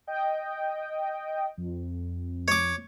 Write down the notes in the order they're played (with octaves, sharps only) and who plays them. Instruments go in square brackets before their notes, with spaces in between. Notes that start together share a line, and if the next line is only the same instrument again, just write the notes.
[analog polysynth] D#5 G5
F2
[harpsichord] C#5 D6